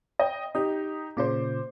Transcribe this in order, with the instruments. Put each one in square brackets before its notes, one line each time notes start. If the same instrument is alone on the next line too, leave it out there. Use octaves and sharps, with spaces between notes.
[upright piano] D#5 G5
[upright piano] D#4 G4 [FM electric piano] D#5
[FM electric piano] A#2 C#3 F4 [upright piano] C5 D6